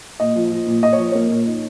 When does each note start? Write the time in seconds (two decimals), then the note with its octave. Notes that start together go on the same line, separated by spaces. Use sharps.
0.20 A#2 D#5
0.36 F3
0.52 F3
0.67 A#2
0.83 A#2 D#5
0.93 C#5
0.98 F3
1.12 A#3 C#5
1.30 A#2
1.47 D#4